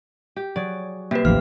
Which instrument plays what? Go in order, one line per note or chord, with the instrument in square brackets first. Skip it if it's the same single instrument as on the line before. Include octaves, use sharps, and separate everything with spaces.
[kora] G4
[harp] F#3 G#4 [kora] D5
[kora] C3 [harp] G3 B6 C7 [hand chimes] A#3 B4
[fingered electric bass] A1 D#2 [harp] F3 A#3 F4 [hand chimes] F6